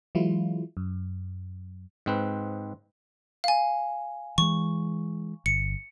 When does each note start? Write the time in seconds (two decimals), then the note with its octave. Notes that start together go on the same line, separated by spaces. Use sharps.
0.15 E3 F#3 G#3 E4 F4
0.77 F#2
2.06 G#2 C4 B4
3.44 F5 G#5
4.38 E3 G#3 C#6
5.46 G1 C#7